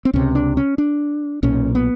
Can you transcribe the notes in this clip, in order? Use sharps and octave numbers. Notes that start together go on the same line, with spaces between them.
C4
C#2 C3 C#4
D4
C#4
D4
B1 A#2 C#4
B3